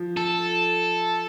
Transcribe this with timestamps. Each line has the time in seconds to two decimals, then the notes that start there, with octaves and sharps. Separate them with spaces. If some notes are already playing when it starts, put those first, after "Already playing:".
Already playing: F3
0.17 A4